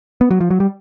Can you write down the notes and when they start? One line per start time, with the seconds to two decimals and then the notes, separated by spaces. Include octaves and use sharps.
0.21 B3
0.31 F#3
0.41 F3
0.50 F#3
0.60 G3